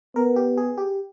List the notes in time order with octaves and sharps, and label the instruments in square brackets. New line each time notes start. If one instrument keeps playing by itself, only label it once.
[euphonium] B3 [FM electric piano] A#4
[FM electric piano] G4
G#4
G4